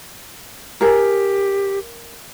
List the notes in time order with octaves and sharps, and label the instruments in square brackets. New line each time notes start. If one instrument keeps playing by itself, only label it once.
[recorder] G4 [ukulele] G#4 A#4